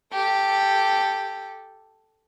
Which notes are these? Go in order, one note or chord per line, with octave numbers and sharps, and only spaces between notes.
G4 A4